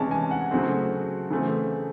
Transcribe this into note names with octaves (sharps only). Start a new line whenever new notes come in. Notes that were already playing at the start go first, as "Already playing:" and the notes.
Already playing: C3 E3 G#3 C#4 A5
G#5
F#5
C#3 F#3 A3 C4
C#3 E3 A3 C4